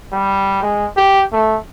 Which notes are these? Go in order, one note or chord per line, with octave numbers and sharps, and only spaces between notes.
G3
G#3
G4
A3